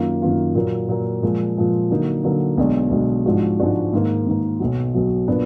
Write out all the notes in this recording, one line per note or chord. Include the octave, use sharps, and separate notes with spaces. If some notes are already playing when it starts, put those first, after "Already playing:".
Already playing: F#2 D#3 A#3 F4
F#2 D#3 A#3 F4
A#2 F#3 A#3
A#2 F#3 A#3
A#2 F3 G#3
A#2 F3 G#3
D3 F#3 A#3 D#4
D3 F#3 A#3 D#4
B1 B2 G#3 D4
B1 B2 G#3 D4
G#2 F3 G#3 D4 F#4
G#2 F3 G#3 D4 F#4
G#2 D#3 A#3
G#2 D#3 A#3
B1 B2 F#3
B1 B2 F#3
A#2 F#3 B3 D4